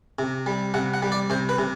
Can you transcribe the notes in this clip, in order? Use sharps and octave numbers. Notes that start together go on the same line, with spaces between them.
C3
G3
C3 F#5
F#5
G3
D5
C3 C5
B4
C3